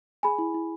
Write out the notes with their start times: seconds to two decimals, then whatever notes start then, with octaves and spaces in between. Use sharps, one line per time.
0.23 G#4 G#5 B5
0.38 E4
0.54 E4